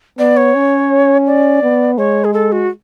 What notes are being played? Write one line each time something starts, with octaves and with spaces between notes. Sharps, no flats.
B3 D5
C#5
C#4
D5
B3
G#3 C#5
G#4
A4
F#4